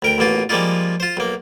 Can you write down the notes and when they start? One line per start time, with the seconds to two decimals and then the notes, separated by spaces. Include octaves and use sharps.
0.02 D2 A#4 G5
0.18 A1 B2 A#3 F4
0.49 F3 G3 G#3 A#3 D#4 F4
1.00 F4 C5
1.17 B1 A#3